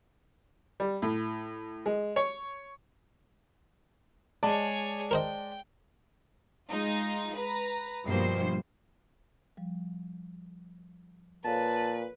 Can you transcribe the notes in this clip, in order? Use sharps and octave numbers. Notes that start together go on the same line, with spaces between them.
G3
A2
G#3
C#5
G#3 G#4 C#5 D5 A5
A#4 C5 D#5 G5
G#3 D#4 F4
B4 A#5
G2 B2 F3 A#3 C5 C7
F3 G3
A#2 A4 B4 C#5 F5 A5